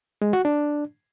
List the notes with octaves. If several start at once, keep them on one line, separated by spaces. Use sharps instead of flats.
G#3
F#4
D4